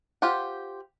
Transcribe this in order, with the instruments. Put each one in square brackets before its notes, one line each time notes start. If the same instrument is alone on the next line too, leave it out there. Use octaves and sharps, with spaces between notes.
[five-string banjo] F4 G4 C5 F#5